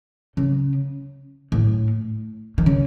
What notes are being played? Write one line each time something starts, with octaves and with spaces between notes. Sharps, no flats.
C#3
A2
D#3
C#3